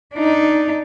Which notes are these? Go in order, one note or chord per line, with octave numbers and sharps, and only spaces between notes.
D4 D#4